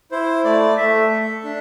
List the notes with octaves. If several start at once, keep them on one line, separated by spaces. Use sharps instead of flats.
E4 C5
A3 D5
A3 E5
A4
D4